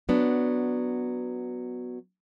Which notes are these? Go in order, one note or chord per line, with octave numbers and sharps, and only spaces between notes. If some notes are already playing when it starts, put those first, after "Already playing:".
F#3 B3 D4